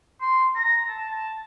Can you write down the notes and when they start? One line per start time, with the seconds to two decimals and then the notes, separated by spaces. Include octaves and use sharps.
0.21 C6
0.56 A#5
0.89 A5
1.11 A5